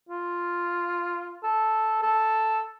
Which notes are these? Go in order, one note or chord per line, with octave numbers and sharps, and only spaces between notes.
F4
A4
A4